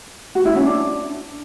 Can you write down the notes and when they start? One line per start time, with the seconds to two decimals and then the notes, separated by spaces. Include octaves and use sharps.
0.35 F#4
0.45 E4
0.56 C#4
0.66 D4